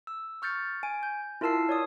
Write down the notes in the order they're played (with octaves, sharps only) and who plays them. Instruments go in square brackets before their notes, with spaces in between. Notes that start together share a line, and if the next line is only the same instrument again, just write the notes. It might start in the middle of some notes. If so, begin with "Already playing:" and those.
[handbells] E6
C#6 F6 G6 A6 C#7
G#5 D7
G6
E4 F4 A#4 A5 E6 C7
C#5 D5 D#6